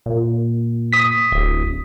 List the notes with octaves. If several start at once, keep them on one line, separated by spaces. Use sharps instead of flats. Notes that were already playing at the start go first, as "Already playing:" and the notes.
A#2
D#6 B6
D1